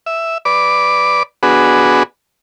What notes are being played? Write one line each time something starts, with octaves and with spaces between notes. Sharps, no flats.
E5
B4 D5 D6
B3 D4 F#4 G#4 B4